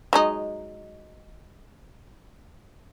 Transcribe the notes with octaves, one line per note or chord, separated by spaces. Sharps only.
F#3 G#3 D#4